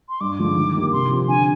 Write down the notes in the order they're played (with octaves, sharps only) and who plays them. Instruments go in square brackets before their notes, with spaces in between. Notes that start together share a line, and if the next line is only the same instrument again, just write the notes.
[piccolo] C6
[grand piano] G2 [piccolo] D6
[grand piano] D3 F3 G#3
D#3
A#3 D#4 G4 A#4
[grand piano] C3 [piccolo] C6
[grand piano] F3 C4 G4
[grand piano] D3 [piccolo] G#5